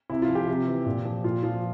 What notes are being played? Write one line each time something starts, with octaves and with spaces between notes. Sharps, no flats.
C3 E4
F4
F3
G4
C3
E3
A#2
F3
A#2 F4
F3 F4